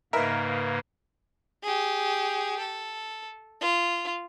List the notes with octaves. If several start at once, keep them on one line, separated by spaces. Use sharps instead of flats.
G#2 C#3 A#3 D#4 A#4 B4 E5
G4 G#4
A4
F4